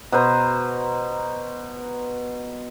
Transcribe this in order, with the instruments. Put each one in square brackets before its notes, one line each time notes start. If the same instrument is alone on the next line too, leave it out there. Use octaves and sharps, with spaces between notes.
[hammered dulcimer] B2 B4 C5 A#5